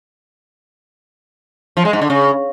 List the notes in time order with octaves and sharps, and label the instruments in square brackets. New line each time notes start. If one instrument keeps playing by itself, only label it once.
[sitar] F3
G#3
G#2
D3
C#3